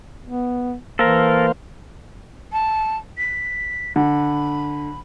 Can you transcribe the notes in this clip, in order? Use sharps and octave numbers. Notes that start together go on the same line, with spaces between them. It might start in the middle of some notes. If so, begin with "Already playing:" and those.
B3
E3 A#3 A4 A#4 C5 F5
A5
B6
D3 B5